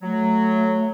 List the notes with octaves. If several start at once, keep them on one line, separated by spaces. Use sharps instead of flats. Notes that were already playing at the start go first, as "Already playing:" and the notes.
F#3 A3